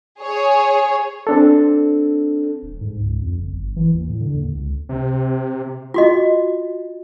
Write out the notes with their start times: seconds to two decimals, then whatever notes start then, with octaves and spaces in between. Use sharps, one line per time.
0.21 G#4 C#5
1.27 C4 D4 A4
2.63 D#1
2.81 G#2
3.00 C#2
3.22 F2
3.39 F#1
3.53 G1
3.76 E3
3.94 D#2
4.09 A2
4.21 D3
4.34 D#2
4.54 C#2
4.89 C3
5.94 F4 F#4 D#5